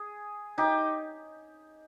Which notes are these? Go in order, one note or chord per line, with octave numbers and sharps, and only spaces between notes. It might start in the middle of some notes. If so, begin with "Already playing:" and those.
Already playing: G#4
D#4 G4